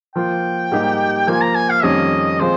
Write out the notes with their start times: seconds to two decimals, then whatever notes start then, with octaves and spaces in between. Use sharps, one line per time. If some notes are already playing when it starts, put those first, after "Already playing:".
0.15 F3 A#3 F4 G5
0.71 G#2 G3 A#3 D#4 G4
1.27 F3 A#3 F4 G#5
1.42 A#5
1.55 G#5
1.70 F5
1.83 F2 D#3 G3 C#4 D#5
2.40 F3 G#3 C4 C5